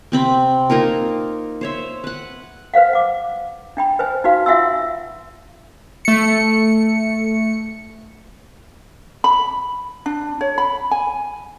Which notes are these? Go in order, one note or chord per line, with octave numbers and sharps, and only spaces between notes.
C3 C4 B5
A#3 D#4 F4 A#4
C5 C#5 E5
B4 F#5
B4 C5 F5 F#5
F#5 D6
D4 G5 B5
B4 C5 G#5
D#4 F#4 B4 F5
F4 E5 F#5 G#5 C6 E6
A3 C#7
B5
D4
C#5
B5
G#5